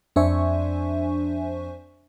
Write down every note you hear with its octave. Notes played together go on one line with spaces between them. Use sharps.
F2 D4 C5 E5 G#5 C#6